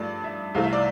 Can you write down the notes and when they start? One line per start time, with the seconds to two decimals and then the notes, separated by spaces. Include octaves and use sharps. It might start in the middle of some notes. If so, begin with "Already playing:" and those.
Already playing: G2 F3 A3 D5
0.24 E5
0.55 C2 C3 E3 A3 F5
0.64 E5
0.73 D5